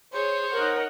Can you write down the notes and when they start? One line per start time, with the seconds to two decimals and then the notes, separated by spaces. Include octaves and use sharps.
0.14 G#4 C5 C#5
0.53 D#4 A#4 D#5 F#5